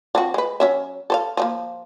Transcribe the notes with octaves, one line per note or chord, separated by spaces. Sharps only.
F3 C4 F#4
G#3 B4
F#3 C#4 E5
A4 C5 F5
F3 F#3 A#3